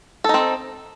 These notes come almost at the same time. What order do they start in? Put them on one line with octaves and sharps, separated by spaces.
A4 D#4 C4